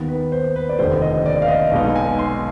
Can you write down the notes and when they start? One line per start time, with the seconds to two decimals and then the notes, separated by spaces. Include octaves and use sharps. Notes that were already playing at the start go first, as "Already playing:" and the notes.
Already playing: D#2 D#3 B3
0.08 B4
0.32 C5
0.56 B4
0.69 D5
0.79 F1 D#2 D3 C5
1.02 D#5
1.26 D5
1.42 F5
1.48 D#5
1.71 B1 B2 G#3 B3 D#4 F5
1.96 G#5
2.19 C6